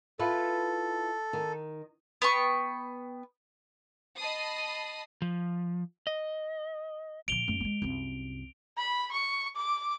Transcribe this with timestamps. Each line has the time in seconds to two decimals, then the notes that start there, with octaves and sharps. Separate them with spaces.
0.19 E4 F4 A4 B4
1.33 D#3
2.22 B3 G5 C#6
4.19 D#5 A5 B5 D#6 C7
5.22 F3
6.07 D#5
7.28 A#2 F3 D7 F7 G7
7.48 F#2 A3
7.60 G#3 A#3
7.82 C2 F#2
8.78 B5
9.12 C#6
9.56 D6